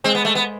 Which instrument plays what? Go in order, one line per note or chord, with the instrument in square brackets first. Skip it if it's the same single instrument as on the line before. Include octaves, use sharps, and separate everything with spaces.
[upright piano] G#3 [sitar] C4
[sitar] B3
A3
B3